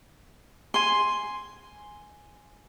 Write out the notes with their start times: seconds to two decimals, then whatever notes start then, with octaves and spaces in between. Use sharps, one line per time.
0.74 G#5 C6